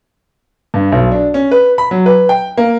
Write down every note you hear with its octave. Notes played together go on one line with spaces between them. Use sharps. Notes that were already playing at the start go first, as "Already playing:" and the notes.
G2
B1
D4
C#4
B4
B5
F#3
B4
G5
A#3